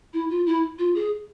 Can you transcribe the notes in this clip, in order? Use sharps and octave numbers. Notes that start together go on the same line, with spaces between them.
E4
F4
E4
F4
G#4